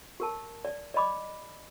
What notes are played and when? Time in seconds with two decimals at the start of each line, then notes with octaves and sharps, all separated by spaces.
0.20 G4 A#4 A5
0.65 D5
0.94 D5 D#5 B5 D6